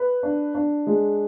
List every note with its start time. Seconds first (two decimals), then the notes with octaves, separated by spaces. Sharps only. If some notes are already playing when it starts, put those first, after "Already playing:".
Already playing: B4
0.23 D4
0.55 D4
0.87 G#3